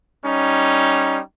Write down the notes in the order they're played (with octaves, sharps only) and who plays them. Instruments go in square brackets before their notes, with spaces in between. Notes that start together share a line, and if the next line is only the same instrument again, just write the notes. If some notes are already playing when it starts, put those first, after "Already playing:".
[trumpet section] G3 C#4 D#4